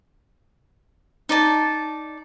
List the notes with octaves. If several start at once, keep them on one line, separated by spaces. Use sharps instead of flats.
D#4 D5 A5